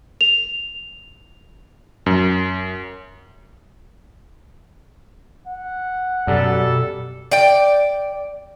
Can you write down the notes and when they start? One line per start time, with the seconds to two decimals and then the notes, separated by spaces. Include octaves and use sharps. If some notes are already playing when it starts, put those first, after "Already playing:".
0.21 F7
2.06 F#2
5.48 F#5
6.27 F#2 B2 G3 A4
7.31 D5 G5